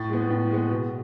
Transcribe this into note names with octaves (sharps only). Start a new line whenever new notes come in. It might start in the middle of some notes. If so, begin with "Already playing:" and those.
Already playing: A2 A6
G#3 B3
A2
G#3 B3
B2